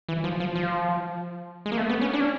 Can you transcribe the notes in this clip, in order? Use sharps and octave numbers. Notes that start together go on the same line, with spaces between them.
E3
F3
F3
F3
G#3
A#3
A3
B3
C#4
D4
C#4